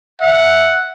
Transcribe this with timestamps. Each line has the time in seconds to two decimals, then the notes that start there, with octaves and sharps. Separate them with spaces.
0.21 E5 F#5